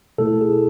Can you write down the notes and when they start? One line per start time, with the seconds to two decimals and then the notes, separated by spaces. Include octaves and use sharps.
0.18 B2 A3 E4 A4
0.41 G#4